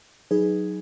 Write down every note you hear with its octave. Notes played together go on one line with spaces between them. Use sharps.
F#3 D#4 G#4 B4